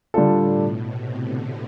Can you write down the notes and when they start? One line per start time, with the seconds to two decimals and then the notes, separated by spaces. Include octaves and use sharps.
0.14 A2 D3 G3 D4 F4 A4
0.49 B2
0.84 C3
1.19 D3